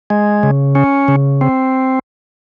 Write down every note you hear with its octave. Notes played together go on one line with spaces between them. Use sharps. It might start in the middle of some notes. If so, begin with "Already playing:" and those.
G#3
C#3
C#4
C#3
C4